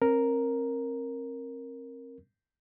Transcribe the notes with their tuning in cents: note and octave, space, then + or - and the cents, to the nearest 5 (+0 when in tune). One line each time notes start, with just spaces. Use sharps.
C4 +35 A#4 +0